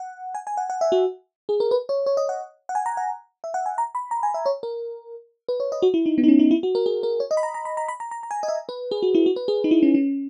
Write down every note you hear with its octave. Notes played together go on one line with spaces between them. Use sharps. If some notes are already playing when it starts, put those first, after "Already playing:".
Already playing: F#5
G#5
G#5
F#5
F#5
E5
F#4
G#4
A#4
B4
C#5
C#5
D#5
F#5
F#5
G#5
A#5
F#5
E5
F#5
G#5
A#5
B5
A#5
G#5
E5
C#5
A#4
B4
C#5
D#5
F#4
E4
D#4
B3
D#4
C#4
D#4
E4
F#4
A#4
G#4
A#4
C#5
D#5
B5
A#5
A#5
B5
A#5
B5
A#5
A#5
A#5
G#5
D#5
E5
B4
G#4
F#4
E4
F#4
B4
G#4
D#4
E4
C#4
C#4